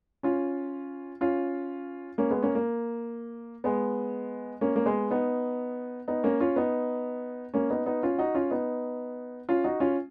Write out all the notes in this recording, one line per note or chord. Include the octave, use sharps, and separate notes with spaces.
C#4 F4
C#4 F4
A#3 C#4
G#3 B3
A#3 C#4
A#3
G#3 B3
A#3 C#4
A#3
G#3 B3
B3 D#4
B3 D#4
A#3 C#4
C#4 F4
B3 D#4
A#3 C#4
B3 D#4
B3 D#4
C#4 F4
D#4 F#4
C#4 F4
B3 D#4
C#4 F4
D#4 F#4
C#4 F4